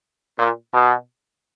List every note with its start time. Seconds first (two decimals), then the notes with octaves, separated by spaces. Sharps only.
0.39 A#2
0.73 B2